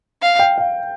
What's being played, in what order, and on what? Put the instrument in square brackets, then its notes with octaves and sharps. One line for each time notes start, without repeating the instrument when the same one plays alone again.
[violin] F5
[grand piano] G5
F5